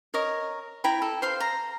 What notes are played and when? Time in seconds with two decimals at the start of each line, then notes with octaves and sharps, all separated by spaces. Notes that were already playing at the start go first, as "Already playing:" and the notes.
0.14 A#4 C#5 D#5
0.84 E4 G5 A#5 B5
1.02 A4
1.22 C5 F5 C6
1.40 A#5